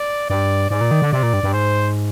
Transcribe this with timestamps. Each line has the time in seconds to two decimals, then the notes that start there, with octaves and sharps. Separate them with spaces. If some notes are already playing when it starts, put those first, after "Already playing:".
Already playing: D5
0.30 G2 D5
0.71 G#2 D5
0.81 A#2
0.91 D#3
1.02 D3
1.12 C3 D5
1.23 A#2
1.33 G2
1.43 G2
1.53 G#2 C5